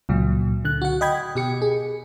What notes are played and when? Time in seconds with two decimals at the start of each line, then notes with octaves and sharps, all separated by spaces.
0.09 C#2 A#2 F#3
0.65 D3 F#6
0.82 F#4 F#5
1.01 D#5 G5 B5 G#6
1.35 B2 G4 C#7
1.62 G#4